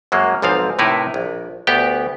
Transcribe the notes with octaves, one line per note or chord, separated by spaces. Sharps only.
F#2 F#3 G#3 A#3
B1 G#2 F3 C4 F5
A2 C3 D#4 E4 A#4 B4
A#1
D2 B3 G4 G5